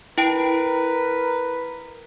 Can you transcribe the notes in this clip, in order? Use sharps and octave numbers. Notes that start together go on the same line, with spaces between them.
E4 A#4 B4 G5 D7